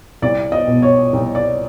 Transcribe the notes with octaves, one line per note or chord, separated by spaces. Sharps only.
C2 D5
D#5
B2
C#5
C2
D5